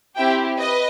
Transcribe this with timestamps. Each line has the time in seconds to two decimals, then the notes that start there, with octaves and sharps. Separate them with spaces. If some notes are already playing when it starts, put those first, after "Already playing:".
0.16 C4 E4 G4 E5 G5
0.59 B4 D#5